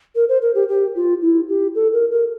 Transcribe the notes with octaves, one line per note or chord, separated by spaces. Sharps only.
A#4
C5
A#4
G4
G4
F4
E4
G4
A4
A#4
A#4